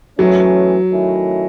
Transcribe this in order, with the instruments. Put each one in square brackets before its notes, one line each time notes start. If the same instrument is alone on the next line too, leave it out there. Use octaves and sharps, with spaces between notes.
[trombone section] E3 A3 C#4 [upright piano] F#3
[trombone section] D#3 A3 C#4 E4